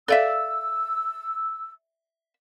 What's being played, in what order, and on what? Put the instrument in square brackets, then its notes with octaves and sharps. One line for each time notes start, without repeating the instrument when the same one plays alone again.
[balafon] A4 F5 [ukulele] D5 E5 [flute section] E6